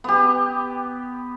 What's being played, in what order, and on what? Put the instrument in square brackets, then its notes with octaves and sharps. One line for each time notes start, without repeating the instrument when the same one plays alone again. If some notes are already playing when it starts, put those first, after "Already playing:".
[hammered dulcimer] B3 G4